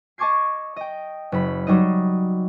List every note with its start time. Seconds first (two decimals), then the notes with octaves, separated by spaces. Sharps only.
0.18 D#5 A5 C#6 D6 G#6 C7
0.76 D#5 G5
1.32 F#1 B5
1.67 F#3 G3 D#4 D#5